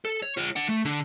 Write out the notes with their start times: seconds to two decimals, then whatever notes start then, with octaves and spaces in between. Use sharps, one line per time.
0.05 A4
0.22 C#5
0.37 F4 C#5
0.56 D4 F#5
0.69 A3
0.85 D3 D4